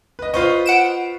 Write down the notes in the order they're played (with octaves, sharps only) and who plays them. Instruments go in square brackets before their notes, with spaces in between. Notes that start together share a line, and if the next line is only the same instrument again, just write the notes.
[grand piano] B4 D#5
[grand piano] F4 B4 C#6 [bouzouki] C5 D#5
[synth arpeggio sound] F#5 D7 E7